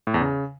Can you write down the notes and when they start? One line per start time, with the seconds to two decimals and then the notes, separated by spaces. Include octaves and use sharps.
0.07 A2
0.14 E2
0.21 C#3